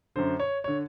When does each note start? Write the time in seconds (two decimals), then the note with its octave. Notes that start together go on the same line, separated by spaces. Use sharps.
0.16 F#2 D3 C5
0.40 C#5
0.64 D3 C#5